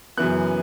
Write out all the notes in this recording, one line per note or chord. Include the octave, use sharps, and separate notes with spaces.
F#2 C#3 E3 B3 F#6